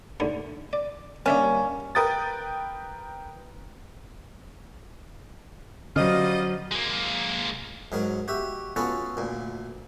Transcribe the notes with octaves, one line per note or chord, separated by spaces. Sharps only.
D#2 A2 D3
D5
G3 A#3 C#4 D4 E5 A5
A#4 B4 G5 D#6 A6
D3 F#3 G3 C#4 F4 C5 D#5 F6
G#3 A#3
G#2 F#3 A#4
F#4 G4 E5
B3 C#4 F4 F#4 A4
D2 A#2